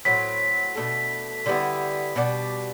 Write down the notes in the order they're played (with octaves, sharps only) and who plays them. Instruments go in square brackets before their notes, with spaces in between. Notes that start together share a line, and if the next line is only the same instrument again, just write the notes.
[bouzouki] A2 F#3 C4 [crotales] B6
[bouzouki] B2 A3 D4 A4
D3 G3 B3 E4
B2 G3 D4